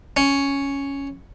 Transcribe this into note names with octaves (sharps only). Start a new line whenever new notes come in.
C#4